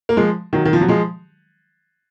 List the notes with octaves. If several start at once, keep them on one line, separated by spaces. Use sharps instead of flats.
A#3
F3 G#3
D#3 F#3
D#3
F3
F#3
F3 G#3